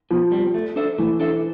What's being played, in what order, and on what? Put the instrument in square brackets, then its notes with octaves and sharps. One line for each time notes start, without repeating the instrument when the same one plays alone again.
[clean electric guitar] B2 [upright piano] F3
[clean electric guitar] G3 C4
A3
D4 A4 C5 E5
[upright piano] E3 [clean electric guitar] A3
[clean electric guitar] D4 A4 C5 E5